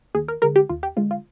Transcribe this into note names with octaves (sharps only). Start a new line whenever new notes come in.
D#2 G#4
A#4
D3 G#3 A#4
G4
D#2 F4
G4
D3 G#3 F4
F4